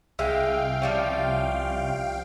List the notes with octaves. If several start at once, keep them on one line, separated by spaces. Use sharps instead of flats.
C2 G#3 E5 F5 G5
F3 G3 C#4